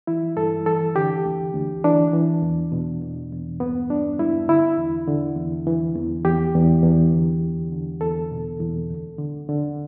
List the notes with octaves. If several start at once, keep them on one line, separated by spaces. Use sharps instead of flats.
E3 E4
G2 A4
E3 A4
D3 G4
D2
D2
E3 D4
E3
E2
B2
E2
E2
G2 B3
G2 D4
G2 E4
D3 E4
E2
D3
E2
E3
E2
E2 G4
E2
E2
D3
D2
D3
E2 A4
B2
E2
D2
D3
D3